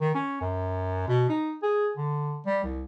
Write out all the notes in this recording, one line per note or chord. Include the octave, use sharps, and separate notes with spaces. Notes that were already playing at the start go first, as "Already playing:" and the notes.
D#3
C#4
F#2
B2
D#4
G#4
D3
G3
C2